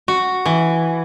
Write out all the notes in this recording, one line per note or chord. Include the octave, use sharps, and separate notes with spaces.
F#4
E3